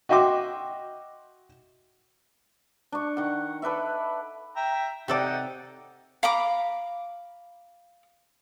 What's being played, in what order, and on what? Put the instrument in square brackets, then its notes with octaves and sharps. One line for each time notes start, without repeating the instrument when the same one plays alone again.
[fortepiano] F#4 D#5 E5 G5 C6 D6
[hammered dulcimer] D4 C#6
D#3 F#5
A4 B4 D5 E5
[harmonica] E5 G5 A#5
[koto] C3 A4 D5 [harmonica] D#4 F#5 G5
[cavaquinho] F5 A#5 B5 D6